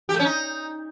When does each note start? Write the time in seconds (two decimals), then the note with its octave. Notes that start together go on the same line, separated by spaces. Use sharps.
0.09 G4
0.14 A3
0.19 C#4
0.25 D#4